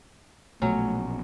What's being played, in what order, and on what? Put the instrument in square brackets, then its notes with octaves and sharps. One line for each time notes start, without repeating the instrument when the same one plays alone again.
[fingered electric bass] A#1 B2 [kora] F#3 C#4 [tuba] A3